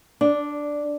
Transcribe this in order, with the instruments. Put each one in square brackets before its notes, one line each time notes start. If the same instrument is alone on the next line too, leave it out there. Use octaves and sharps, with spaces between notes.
[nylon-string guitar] D4